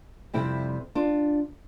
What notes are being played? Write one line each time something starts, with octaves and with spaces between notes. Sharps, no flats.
F2 C3 G3 C4 E4
D4 F4